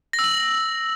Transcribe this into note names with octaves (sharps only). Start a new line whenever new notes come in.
A#6
E6
F#7